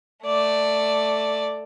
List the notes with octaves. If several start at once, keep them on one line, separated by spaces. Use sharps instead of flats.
A3 D5